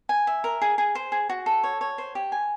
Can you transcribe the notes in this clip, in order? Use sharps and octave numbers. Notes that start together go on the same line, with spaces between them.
G#5
E5
A#4
G#4
G#4
C5
G#4
F#4
A4
C#5
C#5
C5
G4
G#5